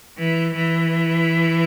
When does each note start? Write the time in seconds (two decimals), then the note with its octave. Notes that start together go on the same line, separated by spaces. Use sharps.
0.19 E3
0.54 E3